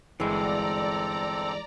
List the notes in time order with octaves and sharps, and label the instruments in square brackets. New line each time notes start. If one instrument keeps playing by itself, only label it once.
[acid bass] G1 [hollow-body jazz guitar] E3 G#3 [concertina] C4 A4 [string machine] D5 A#5